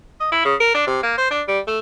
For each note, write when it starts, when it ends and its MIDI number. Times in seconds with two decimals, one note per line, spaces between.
0.20 0.27 75
0.32 0.40 64
0.45 0.55 49
0.60 0.73 70
0.74 0.86 62
0.87 1.01 48
1.03 1.17 58
1.18 1.29 72
1.31 1.42 62
1.48 1.60 55
1.67 1.79 57